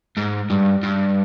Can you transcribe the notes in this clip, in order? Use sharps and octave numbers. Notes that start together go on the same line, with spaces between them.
G#2
G2
G2